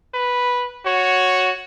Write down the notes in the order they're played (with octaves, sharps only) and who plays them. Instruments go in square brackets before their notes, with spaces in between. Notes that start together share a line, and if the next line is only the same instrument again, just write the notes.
[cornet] B4
[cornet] F#4 [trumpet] C#5